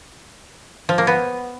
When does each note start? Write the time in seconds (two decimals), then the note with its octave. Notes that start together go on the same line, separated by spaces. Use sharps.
0.89 F3
0.98 A#3
1.07 B3